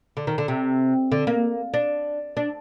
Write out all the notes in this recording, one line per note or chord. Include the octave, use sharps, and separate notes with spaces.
D3
D#3
D3
C3
D3
A#3
D4
D4